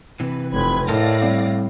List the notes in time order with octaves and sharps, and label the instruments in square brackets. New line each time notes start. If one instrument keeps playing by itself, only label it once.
[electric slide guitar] C3 E3 [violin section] B4
[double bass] F1 [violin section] B4 B5 G#6
[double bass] A2 [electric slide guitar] A#4 D#5 A5 [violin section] D5 F5 A#6
[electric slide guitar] G3 C4